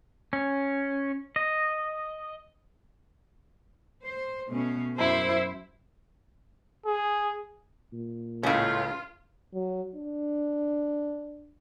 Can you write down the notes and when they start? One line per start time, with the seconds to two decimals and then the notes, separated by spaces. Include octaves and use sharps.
0.33 C#4
1.36 D#5
4.04 C5
4.50 B2 A3 C#4
4.99 F#2 E4 C5
6.86 G#4
7.92 A#2
8.43 C#2 A2 C#3 C#4 F4 E5
9.54 F#3
9.95 D4